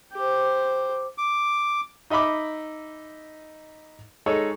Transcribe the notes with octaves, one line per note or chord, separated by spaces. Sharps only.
G4 C5
D6
D#4 D#5 E5 B5 D6
G#3 D#4 A4 C#5